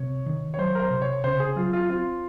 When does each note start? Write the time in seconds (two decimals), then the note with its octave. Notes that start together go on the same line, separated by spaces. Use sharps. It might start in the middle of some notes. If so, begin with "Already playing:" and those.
Already playing: C3 C#5
0.26 D#3
0.54 C#5
0.58 F#3 C5
0.75 A#4
0.80 C5
0.91 C3
1.02 C#5
1.24 C#3 C5
1.40 G#4
1.56 F#3 F4
1.73 F4
1.89 C4 F4